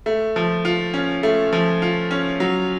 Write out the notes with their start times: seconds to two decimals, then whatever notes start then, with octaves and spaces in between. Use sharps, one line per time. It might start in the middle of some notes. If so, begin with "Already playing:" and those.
0.06 A3
0.36 F3
0.65 F4
0.94 C#4
1.23 A3
1.53 F3
1.82 F4
2.11 C#4
2.40 F#3